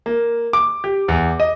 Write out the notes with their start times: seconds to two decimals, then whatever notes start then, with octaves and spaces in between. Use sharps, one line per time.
0.06 A#3
0.53 D6
0.84 G4
1.08 E2
1.40 D#5